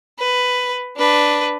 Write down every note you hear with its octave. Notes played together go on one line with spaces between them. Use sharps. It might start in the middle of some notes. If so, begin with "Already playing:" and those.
B4
D4 B4